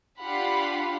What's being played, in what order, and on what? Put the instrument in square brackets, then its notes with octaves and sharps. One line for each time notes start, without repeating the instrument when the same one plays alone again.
[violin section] D4 F4 G4 F5 F#5 B5